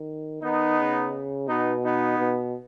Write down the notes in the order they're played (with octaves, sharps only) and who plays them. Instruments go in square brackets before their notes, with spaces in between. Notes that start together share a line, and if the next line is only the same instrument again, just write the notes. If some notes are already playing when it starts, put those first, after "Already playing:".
Already playing: [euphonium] D#3
[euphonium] D#3 [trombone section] B3 D#4
[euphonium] C#3
[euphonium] B2 [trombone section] B3 D#4
[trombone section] B3 D#4
[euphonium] B2